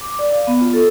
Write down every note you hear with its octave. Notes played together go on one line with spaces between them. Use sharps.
D6
D5
F5
B3
F4
A4